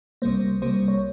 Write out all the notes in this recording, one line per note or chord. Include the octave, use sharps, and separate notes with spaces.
C2 C3 G3 A#3 C5
C2 C3 G3 A#3 C5
C#5